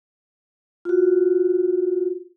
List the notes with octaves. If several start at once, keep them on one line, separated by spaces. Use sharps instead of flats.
F4 F#4